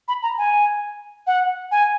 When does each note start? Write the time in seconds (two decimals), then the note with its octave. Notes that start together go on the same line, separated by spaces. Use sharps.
0.08 B5
0.23 A#5
0.38 G#5
1.27 F#5
1.71 G#5